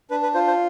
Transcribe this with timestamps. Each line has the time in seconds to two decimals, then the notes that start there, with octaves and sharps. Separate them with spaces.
0.11 D4 B4
0.23 B4
0.34 F4 C5
0.47 C5